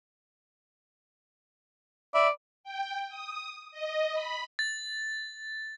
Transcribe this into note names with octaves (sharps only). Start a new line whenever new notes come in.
D5 E5 B5
G5
D#6
D#5
B5
A6